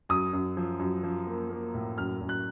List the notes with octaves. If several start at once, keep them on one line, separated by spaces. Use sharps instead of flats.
F#2 D#6
F#2
F3
F#2
F3
A#3
A#3
A2
F#2 F6
F#2
F#6